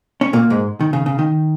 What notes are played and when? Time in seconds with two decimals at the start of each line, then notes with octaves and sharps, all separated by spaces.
0.21 C#4
0.33 A#2 A#3
0.50 G#2 G#3
0.81 D#3
0.93 C#3
1.06 C#3
1.19 D#3